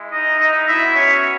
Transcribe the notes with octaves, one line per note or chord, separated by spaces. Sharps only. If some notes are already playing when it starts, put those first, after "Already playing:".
Already playing: G#3 E4
D#4 D#5
D#4 D#5
B3 E4 F#4 E5
C#4 C#5